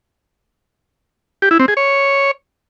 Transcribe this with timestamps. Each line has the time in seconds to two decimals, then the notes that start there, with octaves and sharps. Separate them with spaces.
1.42 G4
1.51 E4
1.59 C4
1.68 G#4
1.77 C#5